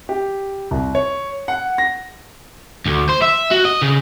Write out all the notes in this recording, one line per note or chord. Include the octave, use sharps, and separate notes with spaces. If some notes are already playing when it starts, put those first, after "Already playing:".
G4
C2
C#5
F#5
A#6
D2
C5
E5
F#4
D#5
C#3